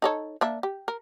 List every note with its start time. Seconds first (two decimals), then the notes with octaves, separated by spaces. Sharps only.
0.02 D#4 A4 C#5
0.41 A#3 D4 E5
0.63 G4
0.88 A#4